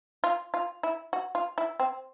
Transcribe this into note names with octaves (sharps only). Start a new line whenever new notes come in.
F4
F4
E4
F#4
F4
E4
C4